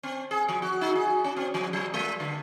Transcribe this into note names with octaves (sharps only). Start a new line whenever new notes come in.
C4
G#4
F3
F#4
D#4
G#4
C#4
C4
F3
F#3
G#3
D3